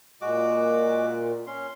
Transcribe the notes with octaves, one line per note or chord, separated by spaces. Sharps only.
A#2 G#3 F#4 D6
C#4 C6